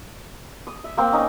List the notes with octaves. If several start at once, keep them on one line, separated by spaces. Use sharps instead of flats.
D#6
E5
A#3 C4
C#4 D#4